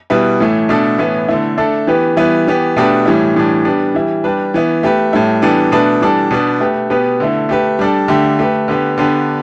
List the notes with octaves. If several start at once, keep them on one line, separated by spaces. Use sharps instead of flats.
B2 G3 E4 B4
A2 E3 A3
B2 A3 D4 A4
A2 E3 B3 E4
D3 A3 E4
A3 D4 A4
E3 B3 G4 B4
E3 G3 B3 E4 B4
E3 B3 G4
B2 A3 D4 G4 B4
A2 E3 G3 E4
A2 E3 G3 D4
G3 B3 D4
E3 G3 E4
G3 D4 B4
E3 B3 E4
A3 G4 B4
A2 G3 E4 A4
E3 G3 B3 D4 A4
B2 A3 D4 B4
E3 G3 D4 A4
B2 B3 D4
A3 G4 B4
B2 B3 G4 B4
D3 A3 E4
A3 G4 B4
G3 D4 A4
D3 A3 G4
A3 G4 B4
D3 B3 G4 B4
D3 B3 D4 G4 B4